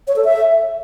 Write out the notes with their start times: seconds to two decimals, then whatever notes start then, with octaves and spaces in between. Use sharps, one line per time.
0.08 C#5
0.16 A4
0.25 E5